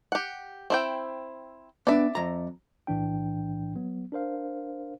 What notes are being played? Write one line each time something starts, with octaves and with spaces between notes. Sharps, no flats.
G4 F#5
C4 E4 G5
B3 D4 D5 E5
F2 A#5
B1 A2 E3 D4 G5
F#3 B3
D4 A#4 C5 F5